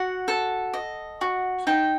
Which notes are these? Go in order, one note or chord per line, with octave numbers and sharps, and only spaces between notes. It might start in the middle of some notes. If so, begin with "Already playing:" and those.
Already playing: F#4 F#5
A4
D#5
F#4
D#4 G5